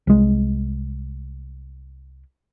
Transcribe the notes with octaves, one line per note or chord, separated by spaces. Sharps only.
C2 G#3